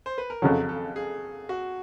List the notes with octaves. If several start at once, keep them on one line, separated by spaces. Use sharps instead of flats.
C5
B4
A#4
F2 C#3 F#3 A4
A4
G#4
F#4